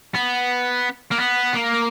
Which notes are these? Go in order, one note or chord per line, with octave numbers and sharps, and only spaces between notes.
B3
A#3
B3
A#3